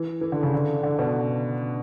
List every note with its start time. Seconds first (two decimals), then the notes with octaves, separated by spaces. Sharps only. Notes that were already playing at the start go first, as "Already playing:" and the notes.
Already playing: E3
0.21 E3
0.32 D3
0.43 C#3
0.54 D3
0.83 D3
0.99 B2